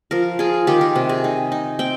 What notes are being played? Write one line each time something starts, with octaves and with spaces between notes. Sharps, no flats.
F3 A#4
F4 G#4
D#3 G4
A#4
C3
G#4
D#4
D#4
C4 G5